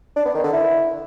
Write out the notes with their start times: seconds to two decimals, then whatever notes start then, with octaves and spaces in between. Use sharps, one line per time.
0.16 D4
0.25 B3
0.35 D#3
0.44 D3
0.53 E4